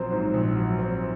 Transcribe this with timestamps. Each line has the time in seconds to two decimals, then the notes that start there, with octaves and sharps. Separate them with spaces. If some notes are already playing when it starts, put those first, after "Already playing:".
Already playing: A#1 F#3 C4 C5
0.11 G#2
0.34 A#1
0.56 F#3
0.79 C4